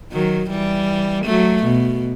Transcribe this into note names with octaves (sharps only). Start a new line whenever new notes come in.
D#3 F#3
E3 G3
F#3 A3
B2